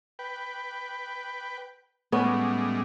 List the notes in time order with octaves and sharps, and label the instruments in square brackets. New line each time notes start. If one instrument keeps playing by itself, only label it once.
[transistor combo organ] B4 G5
[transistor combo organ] A2 G3 G#3 [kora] B3 C#4